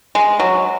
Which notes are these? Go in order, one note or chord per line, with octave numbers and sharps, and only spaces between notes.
G#3
F#3